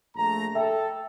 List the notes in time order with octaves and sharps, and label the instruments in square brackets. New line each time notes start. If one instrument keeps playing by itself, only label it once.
[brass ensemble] A#1 A3 A#5
[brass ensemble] A4 [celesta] E5 G5